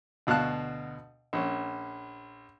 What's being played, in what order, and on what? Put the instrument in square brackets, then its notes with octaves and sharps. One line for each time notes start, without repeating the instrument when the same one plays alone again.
[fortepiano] D2 B2 F5 A5 F#6
A#1 C#4